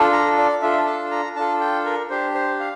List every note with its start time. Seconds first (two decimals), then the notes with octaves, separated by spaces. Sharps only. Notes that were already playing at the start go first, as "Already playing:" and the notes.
Already playing: D4 F4 A4
0.13 A#5
0.38 D5
0.62 D4 F4 A4 E5
0.86 A5
1.11 A#5
1.36 D4 F4 A4 A5
1.60 G5
1.85 A#4
2.10 D4 G4 C5
2.34 C5
2.60 F5